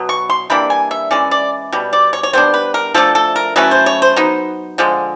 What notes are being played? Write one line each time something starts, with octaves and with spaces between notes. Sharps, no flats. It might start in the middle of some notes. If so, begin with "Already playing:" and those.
Already playing: B2 F#3 B3
C#6
C6
E3 G3 A#3 D4 B5
G#5
E5
E3 G#3 C#4 D5
D5
B2 G3
D5
C#5
C#5
G3 B3 D4 C5
B4
A#4
F3 A3 D4 A4
A4
A#4
F#3 A3 C#4 E4 B4
C5
C#5
C5
F#3 B3 D#4
D3 F3 G#3